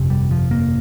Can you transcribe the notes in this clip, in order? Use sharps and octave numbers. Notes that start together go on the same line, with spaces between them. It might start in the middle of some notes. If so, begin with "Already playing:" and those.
Already playing: G1 F2 C3
G3
F3
A#3